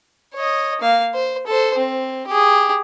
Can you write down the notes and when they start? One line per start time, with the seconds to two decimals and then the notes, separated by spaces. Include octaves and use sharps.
0.34 C#5 D#5
0.81 A#3 F5
1.14 C5
1.47 A4 C5
1.78 C4
2.27 G4 G#4